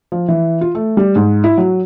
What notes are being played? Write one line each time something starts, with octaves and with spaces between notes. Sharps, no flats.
F3
E3
F4
A3
G3
G#2
E4
F#3